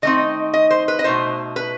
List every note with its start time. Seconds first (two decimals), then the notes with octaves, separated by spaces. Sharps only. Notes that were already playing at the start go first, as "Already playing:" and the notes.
0.02 D#3 A3 C4 D#4 D#5
0.54 D#5
0.70 C5
0.88 B4
0.99 D#5
1.04 B2 A3 D#4 C5
1.56 B4